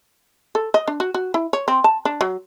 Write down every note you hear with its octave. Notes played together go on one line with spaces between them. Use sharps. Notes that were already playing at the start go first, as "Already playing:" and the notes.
A4
D#5
D4
F#4
F#4
E4
C#5
C4
A5
D4
F#3